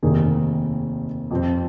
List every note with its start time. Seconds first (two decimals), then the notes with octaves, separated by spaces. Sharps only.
0.03 F1 D#2 D#3 A#3 G#4
1.31 F2 F3 C4